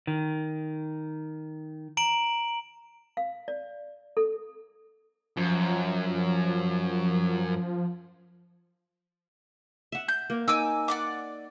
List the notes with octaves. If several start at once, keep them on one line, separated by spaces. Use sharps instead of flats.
D#3
A#5 D7 F#7
F5
D5
A4
F#2 F3
E5 F#5
G6
A#3
D#4 G#5 D6 E6
D5 F#5 D6